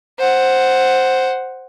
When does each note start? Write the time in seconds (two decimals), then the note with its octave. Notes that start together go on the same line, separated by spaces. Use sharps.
0.19 C5 F#5